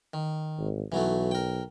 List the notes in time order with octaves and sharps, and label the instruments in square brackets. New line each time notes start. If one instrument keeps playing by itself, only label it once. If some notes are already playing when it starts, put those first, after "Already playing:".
[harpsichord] D#3
[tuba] G#1
[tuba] B1 [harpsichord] E3 F#3 A3
[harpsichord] A#4 G5